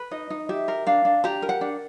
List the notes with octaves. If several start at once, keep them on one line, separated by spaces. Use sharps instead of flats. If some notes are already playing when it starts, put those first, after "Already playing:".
Already playing: B4
D#4 D#5
D#4
G4 E5
A#4
D4 F5
D4
G4 A#5
A#4
F#5
D4